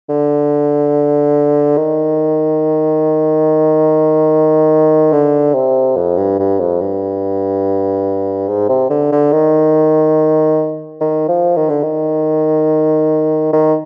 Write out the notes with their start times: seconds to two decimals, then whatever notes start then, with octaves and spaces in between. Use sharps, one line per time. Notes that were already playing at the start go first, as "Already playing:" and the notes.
0.09 D3
1.77 D#3
5.13 D3
5.54 C3
5.97 F2
6.18 G2
6.39 G2
6.60 F2
6.81 G2
8.49 G#2
8.69 C3
8.90 D3
9.12 D3
9.33 D#3
11.01 D#3
11.28 F3
11.57 D#3
11.70 D3
11.83 D#3
13.53 D#3